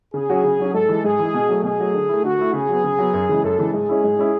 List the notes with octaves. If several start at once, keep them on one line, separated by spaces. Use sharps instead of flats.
C#3 G#4
F#3 C#4 F#4
C#3
F#3 C#4 F#4
G#2 A4
E3 G#3
G#2 G#4
E3 G#3
B2
F#3 A3
B2 G#4
F#3 A3
D3
A3 E4
D3 F#4
A3 E4
C#3 G#4
F#3 B3
C#3
F#3 B3
F#2
C#3 E3 G#3
F#2 A4
C#3 E3 G#3
G#2 G#4
G#3 C#4 E4
G#2
G#3 C#4 E4